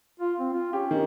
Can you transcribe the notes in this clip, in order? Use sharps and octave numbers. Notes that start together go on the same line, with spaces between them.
F4
C4
F4
C#4 G4
D#3